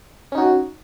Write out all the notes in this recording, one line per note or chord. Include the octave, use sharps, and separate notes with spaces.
C#4 D#4 F#4